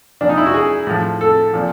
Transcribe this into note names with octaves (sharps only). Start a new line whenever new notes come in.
A#2 F3 D4
D#4
E4
F#4
G#4
A2 F3
A4
A#2 F3